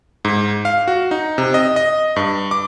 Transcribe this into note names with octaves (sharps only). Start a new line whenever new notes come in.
G#2
F5
F#4
D#4
C3
D#5
D#5
G2
D6